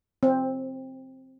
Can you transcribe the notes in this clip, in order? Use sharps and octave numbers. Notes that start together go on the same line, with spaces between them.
C4